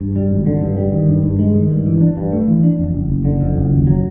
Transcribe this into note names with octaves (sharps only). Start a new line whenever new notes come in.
G2
G3
G#1
D3
G2
G3
D#3
G2
G2
G#3
D#3
G2
E3
D4
G2
A3
E3
D4
F2
F#1
F#1
D3
F2
F#1
D#2
F#3